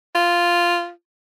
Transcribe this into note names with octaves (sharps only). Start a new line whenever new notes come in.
F4